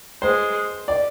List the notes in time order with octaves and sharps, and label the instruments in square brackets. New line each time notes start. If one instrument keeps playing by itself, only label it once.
[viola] G#3 [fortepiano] C5
[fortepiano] D5